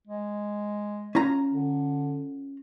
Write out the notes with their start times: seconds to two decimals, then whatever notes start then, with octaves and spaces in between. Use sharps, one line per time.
0.07 G#3
1.15 C#4 F4 A#5
1.52 D3